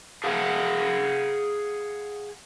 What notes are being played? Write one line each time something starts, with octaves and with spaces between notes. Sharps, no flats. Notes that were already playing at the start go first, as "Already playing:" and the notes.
G#4 F5 F#5